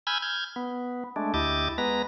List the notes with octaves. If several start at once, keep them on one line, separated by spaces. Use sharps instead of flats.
G#5 B5 E6 F6 G6 G#6
F6 G6 G#6
B3
G#3 A3 D4
D2 E4 G4 D#5 D6 A6
G#3 B3 B4 A#5 A#6